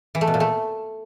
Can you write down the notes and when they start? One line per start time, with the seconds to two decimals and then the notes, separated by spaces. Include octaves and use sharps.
0.15 E3
0.21 A3
0.27 B2
0.34 A#2
0.40 A3